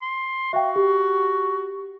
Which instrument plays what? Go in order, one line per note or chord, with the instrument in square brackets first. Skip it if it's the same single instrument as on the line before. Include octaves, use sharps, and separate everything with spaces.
[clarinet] C6
[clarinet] F#4 [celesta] E5 F5 G5
[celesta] G4